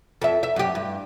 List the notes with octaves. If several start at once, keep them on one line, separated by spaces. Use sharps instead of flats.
F2 E5
E5
F#2 G4
G2